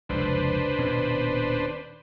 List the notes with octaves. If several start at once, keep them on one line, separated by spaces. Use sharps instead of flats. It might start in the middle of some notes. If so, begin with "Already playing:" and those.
F1 C#2 D4 B4 C5
D#1 B2 C#4